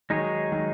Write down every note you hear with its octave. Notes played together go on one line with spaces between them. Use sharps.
D#3 F#3 G#3 D#4 G#4 C#5
D#3 F#3